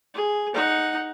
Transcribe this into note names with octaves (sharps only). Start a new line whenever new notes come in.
G#4
D#4 F#5